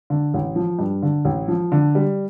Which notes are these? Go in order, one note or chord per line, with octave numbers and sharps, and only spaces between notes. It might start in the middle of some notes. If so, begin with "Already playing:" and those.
D3
A1
F3
G2
D3
A1
F3
D3
G3